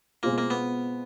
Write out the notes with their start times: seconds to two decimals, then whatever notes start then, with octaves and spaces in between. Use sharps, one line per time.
0.23 B2 G#3 A#3 C4 F4
0.38 A#3
0.50 B3